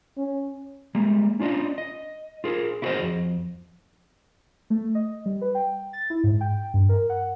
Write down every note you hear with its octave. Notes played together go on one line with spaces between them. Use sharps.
C#4
G3 G#3 A#3
C#4 D4 F4 D5 D#5
D#5
F4 G#4 A#4
E4 F#4 G#4 A#4 C5 D#5
F2
A3
D#5
G3
B4
G5
A6
E4
G#2
G5
G2
A#4
F#5